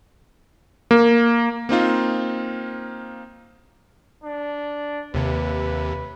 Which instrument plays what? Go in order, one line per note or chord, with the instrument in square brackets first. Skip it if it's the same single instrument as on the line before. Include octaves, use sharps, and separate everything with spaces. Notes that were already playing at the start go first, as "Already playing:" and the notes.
[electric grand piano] A#3
A#3 C4 D#4 F4
[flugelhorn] D4
[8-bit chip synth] D#2 C3 [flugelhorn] B4